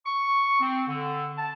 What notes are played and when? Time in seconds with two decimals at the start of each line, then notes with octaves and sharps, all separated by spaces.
0.06 C#6
0.60 C4
0.88 D3
1.38 A5